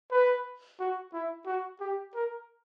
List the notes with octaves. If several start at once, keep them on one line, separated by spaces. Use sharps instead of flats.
B4
F#4
E4
F#4
G4
A#4